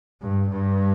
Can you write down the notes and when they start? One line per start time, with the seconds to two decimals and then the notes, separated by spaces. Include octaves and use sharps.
0.21 G2
0.50 G2